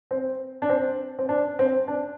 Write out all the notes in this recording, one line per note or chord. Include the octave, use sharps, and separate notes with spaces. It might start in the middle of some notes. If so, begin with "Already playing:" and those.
C4
D4
C4
C4
D4
C4
D4